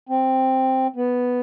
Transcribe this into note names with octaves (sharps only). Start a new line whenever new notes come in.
C4
B3